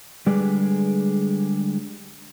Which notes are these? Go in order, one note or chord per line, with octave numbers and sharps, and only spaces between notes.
D3 G3 G#3 G#4 B4 D5